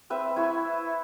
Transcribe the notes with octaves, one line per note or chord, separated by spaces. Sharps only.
C4 B4 E5
E4 C#6 E6